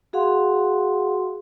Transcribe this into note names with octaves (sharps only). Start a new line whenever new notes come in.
F#4 G#4 F5 F#5 C6